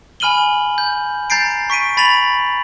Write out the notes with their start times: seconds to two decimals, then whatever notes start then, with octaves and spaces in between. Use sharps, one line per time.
0.20 G#5 B5 F6 D#7 F#7 G7
0.78 G6
1.30 A#5 G6 A6 C7 D7
1.70 C#6 B6 D7 D#7
1.97 B5 A6 B6 D#7 F7 F#7